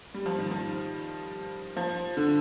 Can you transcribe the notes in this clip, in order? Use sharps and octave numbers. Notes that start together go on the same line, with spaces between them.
G3
F3
D#3
F3
F3
D3